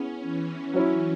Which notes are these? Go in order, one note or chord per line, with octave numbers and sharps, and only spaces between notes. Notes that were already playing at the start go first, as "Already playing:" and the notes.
Already playing: B3 C#4 E4 G#4
E3
F#3 C#4 E4